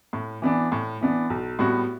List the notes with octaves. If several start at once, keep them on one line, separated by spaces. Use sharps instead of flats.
A2
E3 B3 D4
A2
E3 B3 D4
B1
A2 G3 B3 F#4